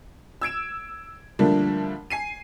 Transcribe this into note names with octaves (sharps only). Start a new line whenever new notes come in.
E6 G#6 D7 E7
D3 F3 G3 A3 A#3 D4
G#5 C7 D#7